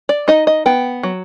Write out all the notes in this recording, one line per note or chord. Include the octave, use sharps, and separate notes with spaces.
D5
D#4 D#5
D#5
B3 G5
F#3